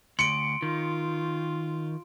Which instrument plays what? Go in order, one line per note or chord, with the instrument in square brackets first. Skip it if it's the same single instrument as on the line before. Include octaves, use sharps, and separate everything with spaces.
[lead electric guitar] D2 [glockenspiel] C6 D7 [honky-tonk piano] C#7
[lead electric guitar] D#3 [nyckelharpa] F4